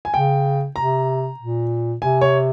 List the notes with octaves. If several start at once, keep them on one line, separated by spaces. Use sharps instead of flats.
G#5
C#3 G5
C3 A#5
A#2
C3 G#5
C#5